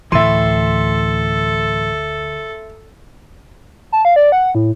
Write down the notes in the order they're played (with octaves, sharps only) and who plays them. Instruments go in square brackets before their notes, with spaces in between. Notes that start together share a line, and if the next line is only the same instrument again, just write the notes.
[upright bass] D2 [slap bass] A2 E3 [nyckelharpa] A4 [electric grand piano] E5 C6
[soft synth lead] A5
F5
D5
F#5
A2